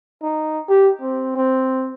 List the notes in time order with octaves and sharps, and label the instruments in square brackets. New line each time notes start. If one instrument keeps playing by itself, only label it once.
[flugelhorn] D#4
G4
C4
C4